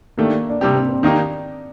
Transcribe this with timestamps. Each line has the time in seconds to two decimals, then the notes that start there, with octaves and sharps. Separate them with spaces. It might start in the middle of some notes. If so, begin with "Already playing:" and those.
0.18 D#3 A3 A#3 D4 G4
0.49 D4
0.61 C3 G3 C4 D4 G4
0.75 C4
0.89 C4
1.03 D#3 A#3 D4 D#4 G4